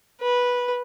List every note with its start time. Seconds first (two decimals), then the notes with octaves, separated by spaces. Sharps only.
0.21 B4